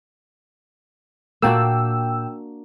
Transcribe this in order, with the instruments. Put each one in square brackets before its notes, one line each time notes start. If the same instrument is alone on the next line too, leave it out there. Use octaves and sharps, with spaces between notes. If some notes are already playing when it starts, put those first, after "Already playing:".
[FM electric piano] A#2 G5 E6 [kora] A#3 D4 F#4